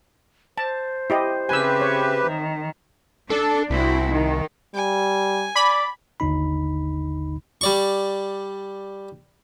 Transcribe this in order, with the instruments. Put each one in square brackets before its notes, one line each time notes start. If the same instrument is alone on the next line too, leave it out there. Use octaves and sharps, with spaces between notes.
[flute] C5 [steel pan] A5
[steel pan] E4 G4 D#5
[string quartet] C#3 C4 E5 [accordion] G4 B4 [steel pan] G#5 E6
[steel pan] C#5
[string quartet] D#3
[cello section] D4 [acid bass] A4
[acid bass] C2 [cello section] C4 E4 F#4
[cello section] D#3
[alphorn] G3 [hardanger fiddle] G#5
[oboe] D5 [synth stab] B5
[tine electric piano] G1 D#2 D3 D#4 B5
[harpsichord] G3 D5 C#6